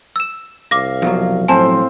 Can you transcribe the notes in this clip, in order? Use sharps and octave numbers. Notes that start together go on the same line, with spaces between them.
E6 E7
C2 F5 D6 A#6
F2 B2 F#3
A2 C4 G#5 A5